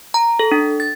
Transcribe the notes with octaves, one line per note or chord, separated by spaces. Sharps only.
A#5
A4
D4
A6